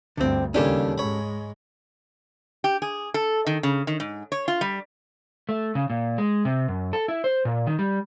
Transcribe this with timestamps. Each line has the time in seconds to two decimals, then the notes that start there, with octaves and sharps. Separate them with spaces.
0.17 D2 G2 D3 C4
0.54 D#2 C#3 G3 C#4 D4 G4 A4
0.98 G#2 G#3 C#5 B5
2.64 G4
2.82 G#4
3.14 A4
3.47 D#3
3.63 C#3
3.87 D#3
4.00 G#2
4.32 C#5
4.48 F4
4.61 G3
5.49 A3
5.75 C#3
5.90 A#2
6.18 G#3
6.45 C3
6.68 F#2
6.93 A4
7.08 E4
7.24 C5
7.45 A#2
7.67 D#3
7.79 G3